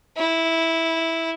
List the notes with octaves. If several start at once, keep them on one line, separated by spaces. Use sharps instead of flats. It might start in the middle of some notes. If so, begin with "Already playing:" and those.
E4